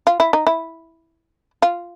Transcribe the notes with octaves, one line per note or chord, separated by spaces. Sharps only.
F4
E4
D#4
E4
F4